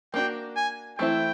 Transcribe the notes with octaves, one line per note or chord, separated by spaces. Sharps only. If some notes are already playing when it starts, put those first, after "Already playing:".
A#3 D4 F#4 G5
G#5
E3 A3 C4 E4 G5